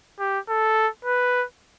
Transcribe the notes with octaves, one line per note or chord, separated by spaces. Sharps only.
G4
A4
B4